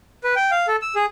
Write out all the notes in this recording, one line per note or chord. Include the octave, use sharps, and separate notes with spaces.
B4
G5
F5
A4
E6
G#4